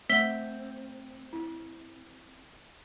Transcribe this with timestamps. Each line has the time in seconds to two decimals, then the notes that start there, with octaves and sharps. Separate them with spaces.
0.10 A3 C4 F#5 B6 G7
1.33 E4